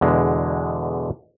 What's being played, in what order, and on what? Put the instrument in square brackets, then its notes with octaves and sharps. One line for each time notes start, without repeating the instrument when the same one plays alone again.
[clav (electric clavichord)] E2 B2 D3 G#3